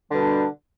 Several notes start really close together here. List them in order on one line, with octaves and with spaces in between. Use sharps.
D3 G3 B2 D4